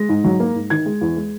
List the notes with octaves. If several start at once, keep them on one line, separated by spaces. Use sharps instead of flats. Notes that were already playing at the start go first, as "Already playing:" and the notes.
Already playing: G#3 A#6
G#2
F#3
A#3
G#2
D#3 G#6
G#3
E2
G#3